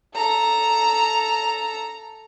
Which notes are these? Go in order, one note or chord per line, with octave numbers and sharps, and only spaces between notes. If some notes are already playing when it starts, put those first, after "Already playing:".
A4 A#5